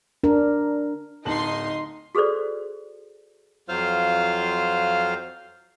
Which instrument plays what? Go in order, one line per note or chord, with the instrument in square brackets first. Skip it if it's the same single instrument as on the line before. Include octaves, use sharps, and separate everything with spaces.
[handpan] D4 A#4
[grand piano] D1 A5 F#7 [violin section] D#4 D#5 C6
[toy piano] F#4 G#4 A4 B4 C5 D5
[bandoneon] F2 F#3 F4 C5 F5 F6